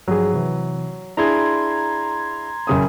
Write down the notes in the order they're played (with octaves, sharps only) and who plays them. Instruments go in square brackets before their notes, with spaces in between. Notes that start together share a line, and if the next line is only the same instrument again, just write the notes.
[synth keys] G2 F3 G#4 [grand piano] F#3
[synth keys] C3 E3
[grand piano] D4 E4 G#4 [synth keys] A#5 C6 G#6
[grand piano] F#1 C#3 D#6